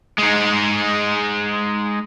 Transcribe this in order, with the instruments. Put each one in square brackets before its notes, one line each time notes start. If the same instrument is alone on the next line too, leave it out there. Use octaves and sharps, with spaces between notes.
[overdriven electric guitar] G#3 D#4